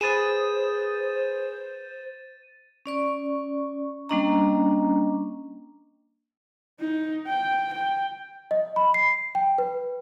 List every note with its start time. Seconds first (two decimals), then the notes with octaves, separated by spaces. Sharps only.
0.01 G#4 B4 C5 D#6 A6 D#7 E7
2.86 C#4 D5 C#6
4.09 G3 A#3 C#4 D4 D#5 A#5
6.80 D#4
7.27 G5
7.73 G5
8.51 D#5
8.76 B5
8.94 C7
9.35 G5
9.58 B4